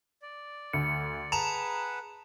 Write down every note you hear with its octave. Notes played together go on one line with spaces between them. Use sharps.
D5
D2 C#7
G#4 B4 F#5 A5 A#5 E7 F7